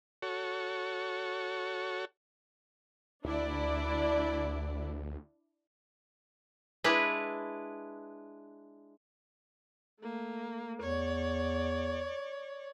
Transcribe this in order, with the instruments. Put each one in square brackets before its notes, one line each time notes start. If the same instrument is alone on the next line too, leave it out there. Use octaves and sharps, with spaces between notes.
[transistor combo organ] F#4 A4 C#5
[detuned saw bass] D2 [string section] D4 E4 D5
[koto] G#3 D4 E4 B4
[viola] A3 A#3
[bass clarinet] E2 [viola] C#5 D5